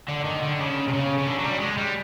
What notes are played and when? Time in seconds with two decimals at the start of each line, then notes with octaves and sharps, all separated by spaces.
0.09 D3
0.25 D#3
0.43 D3
0.60 C#3
0.88 C3
0.93 C#3
1.18 C#3
1.27 D3
1.39 F#3
1.44 G3
1.60 G#3
1.78 G3